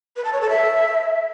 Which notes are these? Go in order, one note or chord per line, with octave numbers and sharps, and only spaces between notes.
B4
A5
C#5
A4
E5